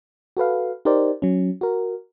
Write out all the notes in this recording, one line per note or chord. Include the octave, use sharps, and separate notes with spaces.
F#4 A4 B4 F5
D#4 G4 A#4 C5 D5
F#3 C#4
F#4 A#4